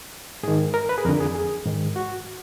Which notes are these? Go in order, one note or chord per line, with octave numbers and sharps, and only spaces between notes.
G#2 D#3 G#4
A#4
B4
G#4
F2 D3 A#4
G#4
G#4
G#2 D#3
F#4